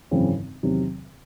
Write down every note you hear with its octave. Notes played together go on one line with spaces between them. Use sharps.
G#1 F#2 C#3 E3 C4
E2 C3 D#3 F#3